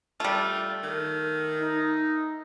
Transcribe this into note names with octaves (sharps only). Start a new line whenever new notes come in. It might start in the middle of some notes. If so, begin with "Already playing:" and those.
G3 A3 F4
D#3
D#4